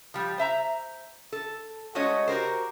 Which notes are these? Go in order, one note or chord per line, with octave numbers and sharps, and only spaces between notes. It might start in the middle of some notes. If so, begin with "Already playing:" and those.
F3 G3
C5 E5 A#5
A4
G#3 A3 C#4 F#4 C#5 D#5
F#4 G4 A#4 C5